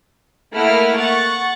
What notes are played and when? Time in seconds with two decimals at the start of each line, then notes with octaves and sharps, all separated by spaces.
0.53 A3 A#3 E4 F#5 F6
0.97 F#5 C#6 A6